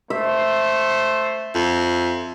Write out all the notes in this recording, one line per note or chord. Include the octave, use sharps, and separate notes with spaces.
A3 C5 E5
F2